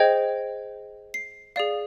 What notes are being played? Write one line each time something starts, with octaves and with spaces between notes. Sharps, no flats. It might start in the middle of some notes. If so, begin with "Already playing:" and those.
Already playing: G#4 C5 D#5 G5 G#6
C7
G#4 D5 F5